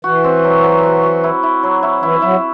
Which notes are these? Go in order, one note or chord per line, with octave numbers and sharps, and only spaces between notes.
E3 F#4
C4
F#3
F#3
F#4
F#4
E4
E4
F#3
E4
E3 E4
F#3 E4